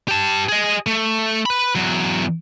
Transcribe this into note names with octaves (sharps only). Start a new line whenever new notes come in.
G4 A5
G#4 D#5
A3
B4 B5
E2 F#3